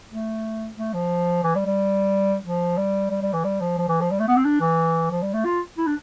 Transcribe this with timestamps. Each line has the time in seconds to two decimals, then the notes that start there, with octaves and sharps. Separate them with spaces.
0.10 A3
0.77 A3
0.94 F3
1.44 E3
1.55 G3
1.66 G3
2.44 F3
2.77 G3
3.10 G3
3.22 G3
3.33 E3
3.44 G3
3.61 F3
3.78 F3
3.89 E3
4.01 F3
4.11 G3
4.20 A3
4.28 B3
4.37 C4
4.45 D4
4.61 E3
5.11 F3
5.23 G3
5.34 A3
5.45 F4
5.78 E4
5.87 D4